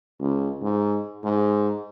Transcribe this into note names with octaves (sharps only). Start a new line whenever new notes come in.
C#2
G#2
G#2